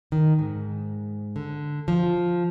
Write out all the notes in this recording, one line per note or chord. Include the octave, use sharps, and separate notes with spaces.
D#3
G#2
D3
F3